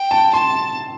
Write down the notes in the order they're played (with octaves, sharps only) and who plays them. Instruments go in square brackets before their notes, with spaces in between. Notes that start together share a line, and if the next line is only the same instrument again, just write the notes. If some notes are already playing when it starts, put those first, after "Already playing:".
Already playing: [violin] G5
[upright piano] A5
[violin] A5 [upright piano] C6